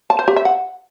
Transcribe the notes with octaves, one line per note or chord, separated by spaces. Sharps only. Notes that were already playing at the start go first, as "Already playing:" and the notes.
A5
C5
G4
E5
F#5